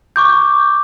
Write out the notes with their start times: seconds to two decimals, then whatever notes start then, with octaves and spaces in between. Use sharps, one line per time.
0.16 C#6 D6 G6